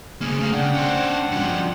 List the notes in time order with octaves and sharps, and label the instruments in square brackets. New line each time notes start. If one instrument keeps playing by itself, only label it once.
[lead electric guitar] C#3 A#3 [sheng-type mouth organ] G#4 F6
[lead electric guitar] A3 F5
[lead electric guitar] C#3 [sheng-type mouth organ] D4 F#5 G5
[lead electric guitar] C#4 C5
G2 F3